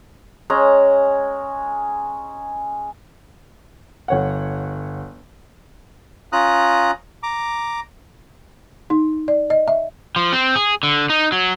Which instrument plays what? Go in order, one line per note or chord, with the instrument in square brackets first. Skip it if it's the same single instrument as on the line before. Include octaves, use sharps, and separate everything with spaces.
[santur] G#3 C#4 A#5
[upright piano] G1 C#5 F#5
[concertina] C#4 F4 A#5 D#6 F#6
A#5 D6
[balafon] D#4
D5
D#5
E5
[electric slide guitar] F3
C4
G#4
D3
D#4
F#3